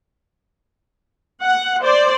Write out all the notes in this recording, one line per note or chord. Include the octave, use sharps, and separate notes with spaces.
F#5
C5 D5